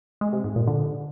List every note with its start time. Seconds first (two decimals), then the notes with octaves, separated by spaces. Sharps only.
0.21 G#3
0.33 C3
0.44 G#2
0.56 A#2
0.67 D3